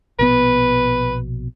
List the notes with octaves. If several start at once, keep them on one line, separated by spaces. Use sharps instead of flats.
A#1 B2 B3 B4